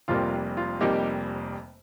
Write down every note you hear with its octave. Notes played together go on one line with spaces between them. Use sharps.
F1 F2 C3 G3 A#3 F4
F4
F1 F2 C3 G3 A#3 D#4 G4